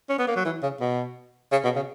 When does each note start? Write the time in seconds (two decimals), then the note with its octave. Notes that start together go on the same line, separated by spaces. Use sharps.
0.09 C#4
0.19 B3
0.27 A#3
0.36 F#3
0.45 E3
0.63 C#3
0.81 B2
1.52 C#3
1.64 B2
1.76 C#3